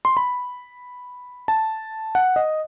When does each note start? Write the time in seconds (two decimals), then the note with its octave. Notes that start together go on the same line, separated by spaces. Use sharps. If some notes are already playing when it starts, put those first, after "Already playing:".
0.05 C6
0.17 B5
1.48 A5
2.15 F#5
2.36 D#5